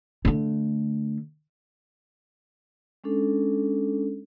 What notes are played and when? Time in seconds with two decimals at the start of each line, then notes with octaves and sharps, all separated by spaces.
0.25 D3 A3
3.04 G#3 C#4 D4 A4